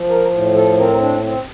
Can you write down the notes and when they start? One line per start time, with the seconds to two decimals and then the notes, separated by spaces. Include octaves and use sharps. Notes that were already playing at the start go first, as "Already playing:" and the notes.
Already playing: F3
0.09 A#4
0.31 A2
0.55 A4
0.77 C4 A#4
1.00 D4
1.23 C4